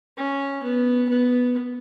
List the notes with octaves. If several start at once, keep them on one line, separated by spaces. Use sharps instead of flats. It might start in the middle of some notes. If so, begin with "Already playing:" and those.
C#4
B3
B3